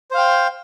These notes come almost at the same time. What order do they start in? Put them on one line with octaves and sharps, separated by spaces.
C5 F5 G5